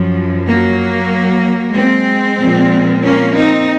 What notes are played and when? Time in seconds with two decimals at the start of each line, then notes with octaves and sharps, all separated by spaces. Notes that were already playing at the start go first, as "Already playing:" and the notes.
Already playing: F#2 F3
0.47 F#3 A#3
1.76 G#3 C4
2.40 A#2 F3
3.04 A#3 C#4
3.35 C4 D#4